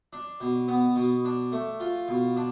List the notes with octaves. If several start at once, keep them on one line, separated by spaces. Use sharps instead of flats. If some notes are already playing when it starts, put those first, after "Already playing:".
D4
B2
B3
B2
D4
A3
F4
B2
D4